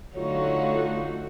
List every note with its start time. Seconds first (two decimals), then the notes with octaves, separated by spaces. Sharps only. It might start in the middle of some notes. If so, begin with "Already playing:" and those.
0.16 D3 F#3 A3 D#4 F4 F#4 C#5